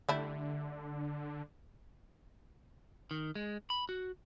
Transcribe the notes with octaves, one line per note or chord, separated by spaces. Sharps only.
D3 G3 A3 E4
D#3
G#3
B5
F#4